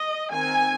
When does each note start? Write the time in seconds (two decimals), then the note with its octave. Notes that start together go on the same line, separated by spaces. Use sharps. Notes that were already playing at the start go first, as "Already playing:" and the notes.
Already playing: D#5
0.32 D#3 C4 G#5